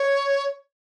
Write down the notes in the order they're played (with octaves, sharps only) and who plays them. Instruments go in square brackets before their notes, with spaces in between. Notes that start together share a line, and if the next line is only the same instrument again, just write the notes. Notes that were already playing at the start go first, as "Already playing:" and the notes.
Already playing: [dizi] C#5